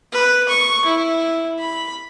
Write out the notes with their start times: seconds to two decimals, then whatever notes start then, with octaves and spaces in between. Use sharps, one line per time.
0.13 B4
0.48 C#6
0.85 E4
1.58 B5